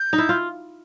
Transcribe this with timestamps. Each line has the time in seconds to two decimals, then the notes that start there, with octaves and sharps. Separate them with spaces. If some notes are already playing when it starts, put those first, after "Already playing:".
Already playing: G6
0.13 D#4
0.18 E4
0.29 F4